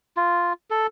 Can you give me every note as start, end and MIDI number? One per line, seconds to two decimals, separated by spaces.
0.17 0.53 65
0.70 0.87 69